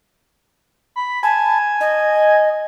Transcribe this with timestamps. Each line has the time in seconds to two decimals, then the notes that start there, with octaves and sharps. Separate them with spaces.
0.96 B5
1.23 G#5 A5
1.81 D#5